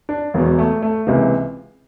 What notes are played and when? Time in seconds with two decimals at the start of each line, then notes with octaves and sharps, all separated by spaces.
0.09 D4
0.34 E1 E2 B2
0.59 A3
0.82 A3
1.07 C#2 C3 E3 A#3